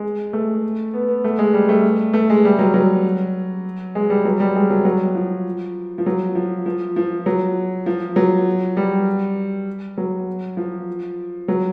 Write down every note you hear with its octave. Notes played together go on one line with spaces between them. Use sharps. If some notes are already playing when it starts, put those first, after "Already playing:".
Already playing: G#3
A3
B3
B3
A3
G#3
G3
A3
A3
G#3
G3
F#3
F#3
G#3
G3
F#3
G3
G#3
F#3
F#3
F3
F3
F#3
F3
F3
F3
F#3
F3
F#3
G3
F#3
F3
F#3